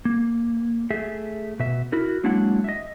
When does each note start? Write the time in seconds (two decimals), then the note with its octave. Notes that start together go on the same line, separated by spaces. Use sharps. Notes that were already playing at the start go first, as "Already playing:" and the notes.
0.05 A#3
0.91 A3 G#4 E5
1.59 B2 E5
1.92 E4 F#4 A#4
2.24 F#3 G#3 A#3 D4 E4 F#5
2.64 D#5 E5